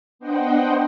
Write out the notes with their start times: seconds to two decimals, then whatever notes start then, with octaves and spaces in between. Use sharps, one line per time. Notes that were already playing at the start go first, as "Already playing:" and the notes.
0.19 B3 D4 C5 D#5 F#5 G5